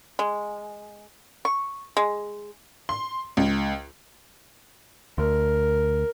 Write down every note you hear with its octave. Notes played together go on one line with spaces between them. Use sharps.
G#3
C#6
G#3
C6
C#2
D2 A#4